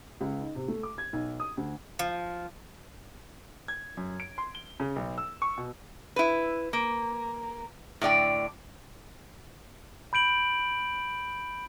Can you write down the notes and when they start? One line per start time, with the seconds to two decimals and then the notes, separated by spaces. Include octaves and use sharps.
0.21 C#2
0.41 D#4
0.55 C3
0.68 A3
0.83 D6
0.98 G#6
1.13 B1
1.40 D#6
1.57 D2
1.99 F3
3.68 G#6
3.97 F#2
4.20 D7
4.38 C6
4.55 G7
4.80 C#3
4.96 B1
5.18 E6
5.42 C#6
5.58 B2
6.16 E4 B4
6.73 A#3
8.01 A2 D3 D5 G5
10.13 B5 G6 D7 F#7